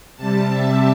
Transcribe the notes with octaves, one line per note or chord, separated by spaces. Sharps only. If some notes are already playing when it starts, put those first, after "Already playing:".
C3 G3 A5
E5